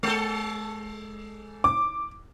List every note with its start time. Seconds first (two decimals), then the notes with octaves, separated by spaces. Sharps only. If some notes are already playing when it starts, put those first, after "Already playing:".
0.03 G#3 A4
1.64 D6